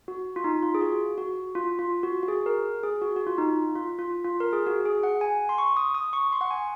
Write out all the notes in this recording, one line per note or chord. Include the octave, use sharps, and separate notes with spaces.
F#4
F4
D#4
F4
G#4
F#4
F#4
F4
F4
F#4
F#4
G#4
A#4
G#4
F#4
F#4
F4
D#4
F4
F4
F4
A#4
G#4
F#4
G#4
F#5
G#5
C6
C#6
D#6
D#6
C#6
C6
F#5
G#5